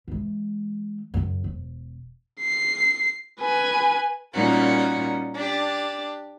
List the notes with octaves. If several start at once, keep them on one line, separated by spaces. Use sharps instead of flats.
E3 G#3
F#2 C#3
E1
C7
B4 G#5
A#2 G3 C#4 D#4 F#4 A#4
D4 G4